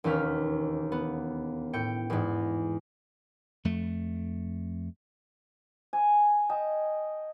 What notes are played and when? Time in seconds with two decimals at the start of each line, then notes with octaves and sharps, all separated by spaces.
0.04 E1 D#2 C#4 F6 B6
0.92 B3
1.73 A2 G5 C#7
2.10 E2 G#2
3.65 F2 A3
5.93 G#5
6.49 D#5 G5 A5